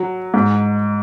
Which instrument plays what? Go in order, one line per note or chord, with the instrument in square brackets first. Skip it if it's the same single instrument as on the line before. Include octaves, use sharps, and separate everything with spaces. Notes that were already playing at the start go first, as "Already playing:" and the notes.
Already playing: [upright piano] F#3
G#2